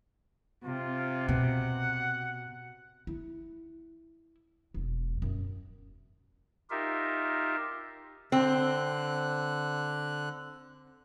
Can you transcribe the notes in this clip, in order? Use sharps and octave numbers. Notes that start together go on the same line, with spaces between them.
C3 F4
B2 F#5
E4
E1
F#2
D#4 F4 G4 A#4 E5
D3 C4 F#6